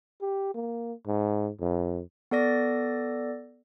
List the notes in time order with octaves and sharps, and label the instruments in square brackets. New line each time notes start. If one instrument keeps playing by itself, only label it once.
[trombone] G4
A#3
G#2
F2
[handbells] B3 A4 D5 A#6